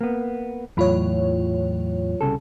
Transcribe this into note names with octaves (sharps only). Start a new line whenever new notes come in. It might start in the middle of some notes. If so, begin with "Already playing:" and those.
A#3 B3
E2 A2 F#3 F4 C#5 B5
C2 C#3 A4